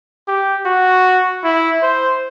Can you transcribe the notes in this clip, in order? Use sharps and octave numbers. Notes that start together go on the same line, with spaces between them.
G4
F#4
E4
C5